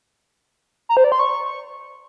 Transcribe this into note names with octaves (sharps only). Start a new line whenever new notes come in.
A#5
C5
D5
C6
C#6